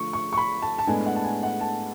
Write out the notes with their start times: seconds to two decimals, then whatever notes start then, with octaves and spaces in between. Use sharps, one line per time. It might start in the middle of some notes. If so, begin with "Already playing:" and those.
Already playing: D3 F3 A3 C#6
0.13 C#6
0.33 C#6
0.37 B5
0.62 A5
0.79 A5
0.87 A2 G#3 B3 D4 G#5
1.06 F#5
1.16 A5
1.24 G#5
1.43 F#5
1.61 A5